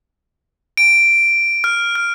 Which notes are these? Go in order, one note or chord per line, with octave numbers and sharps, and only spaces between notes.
D7
F6
F6